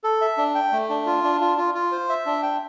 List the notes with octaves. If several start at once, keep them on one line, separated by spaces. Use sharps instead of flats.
A4
E5
D4
G5
A3
D4
F4
D4
F4
F4
F4
C5
E5
D4
G5